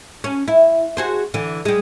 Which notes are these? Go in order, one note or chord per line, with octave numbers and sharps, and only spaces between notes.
C#4
E4
F#4 G#4 C5
D3 E3
G3 G#3